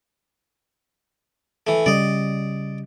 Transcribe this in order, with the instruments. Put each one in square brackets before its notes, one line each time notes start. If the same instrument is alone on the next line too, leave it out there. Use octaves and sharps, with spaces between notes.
[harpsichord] E3 A3
[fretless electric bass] C#3 G3 [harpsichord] D5 D#5